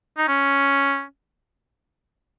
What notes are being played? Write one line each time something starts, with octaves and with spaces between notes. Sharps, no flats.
D#4
C#4